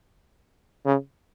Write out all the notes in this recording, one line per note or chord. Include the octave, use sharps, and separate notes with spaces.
C#3